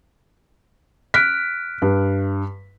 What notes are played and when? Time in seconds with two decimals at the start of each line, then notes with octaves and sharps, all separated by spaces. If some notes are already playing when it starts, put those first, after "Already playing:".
1.14 F6 F#6 B6 D7
1.82 G2